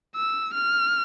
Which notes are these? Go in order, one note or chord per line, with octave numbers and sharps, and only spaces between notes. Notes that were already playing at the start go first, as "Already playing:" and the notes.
E6
F6